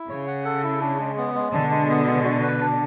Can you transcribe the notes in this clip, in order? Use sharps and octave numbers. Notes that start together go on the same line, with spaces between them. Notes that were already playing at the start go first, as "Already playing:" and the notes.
Already playing: E4
C#3 C#5
F#5
A4
E4
D4
G#3
B3
G#3
B2 D3 D4
G#3
B3
G#3
F#4
B4
D4